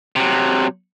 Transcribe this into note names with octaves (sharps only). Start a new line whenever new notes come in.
C3 F#3